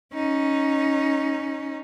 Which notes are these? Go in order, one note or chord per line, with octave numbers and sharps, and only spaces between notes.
C#4 D#4